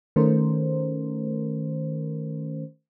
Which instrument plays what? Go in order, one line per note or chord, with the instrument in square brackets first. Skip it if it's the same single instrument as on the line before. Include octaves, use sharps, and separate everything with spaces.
[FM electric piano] D#3 A3 C#4 A#4 C5